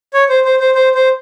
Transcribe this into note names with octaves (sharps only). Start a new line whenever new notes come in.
C#5
C5
C5
C5
C5
C5